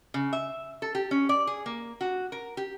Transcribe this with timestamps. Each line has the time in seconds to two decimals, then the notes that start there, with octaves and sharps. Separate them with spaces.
0.14 C#3
0.33 E5
0.82 A4
0.95 G4
1.11 C#4
1.29 D5
1.47 G#4
1.66 A#3
2.01 F#4
2.32 A#4
2.57 G4